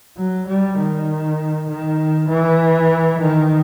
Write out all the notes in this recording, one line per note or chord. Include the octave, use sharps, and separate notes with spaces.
F#3
G3
D#3
D#3
E3
D#3